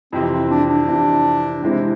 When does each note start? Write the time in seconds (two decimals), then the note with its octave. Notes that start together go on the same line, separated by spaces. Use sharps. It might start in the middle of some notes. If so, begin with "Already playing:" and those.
0.13 F2 C3 E3 C4
0.32 C4
0.51 D4
0.69 D4
0.88 F2 C3 E3
1.62 C3 E3 G#3 C4 E4